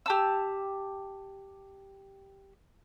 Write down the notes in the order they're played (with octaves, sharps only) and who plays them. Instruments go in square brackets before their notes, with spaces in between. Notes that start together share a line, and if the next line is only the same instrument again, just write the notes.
[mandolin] G4 A5 E6